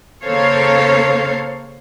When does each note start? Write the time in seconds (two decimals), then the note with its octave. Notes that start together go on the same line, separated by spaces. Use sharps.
0.23 C#3 A#3 A4 C5 C#5 F5